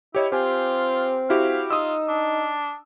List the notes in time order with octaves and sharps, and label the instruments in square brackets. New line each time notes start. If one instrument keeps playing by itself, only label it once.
[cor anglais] E4 [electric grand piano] G4 C#5 D#5
[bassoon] C4 [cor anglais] F4 [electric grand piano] G4 G#5
[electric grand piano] E4 F#4 G4 [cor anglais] F5
[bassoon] D#4 [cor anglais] F4 [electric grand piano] D#6 E6
[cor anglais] D4